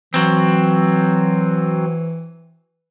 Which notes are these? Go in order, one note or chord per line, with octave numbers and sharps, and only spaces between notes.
E3 F#3 C4